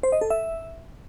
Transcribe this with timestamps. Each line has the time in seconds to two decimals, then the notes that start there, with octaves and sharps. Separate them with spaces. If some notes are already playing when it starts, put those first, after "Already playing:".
0.03 C5
0.12 D#5
0.21 A4
0.30 E5